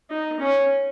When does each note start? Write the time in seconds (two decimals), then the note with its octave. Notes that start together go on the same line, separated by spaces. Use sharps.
0.10 D#4
0.40 C#4